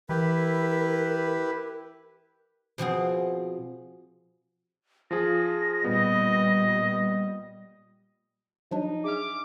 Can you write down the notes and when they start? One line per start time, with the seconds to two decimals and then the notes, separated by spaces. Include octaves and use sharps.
0.09 E3 E4 G4 A#4 B4
2.78 B2 F3 C4 G#4
5.11 F3 F4 G#4 A#6
5.84 A#2 G3 B3 D#5
8.71 F3 F#3 D4 D#4
9.04 G#4 E5 D6 F6